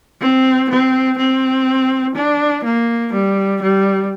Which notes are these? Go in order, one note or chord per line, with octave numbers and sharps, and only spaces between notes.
C4
C4
C4
D4
A#3
G3
G3